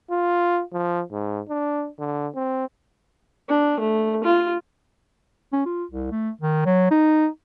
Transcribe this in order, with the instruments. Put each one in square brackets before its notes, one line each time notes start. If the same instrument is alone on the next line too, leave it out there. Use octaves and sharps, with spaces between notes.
[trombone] F4
F3
G#2
D4
D3
C4
[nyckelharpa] D4
A3
F4
[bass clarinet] C#4
F4
C2
A3
D#3
F#3
D#4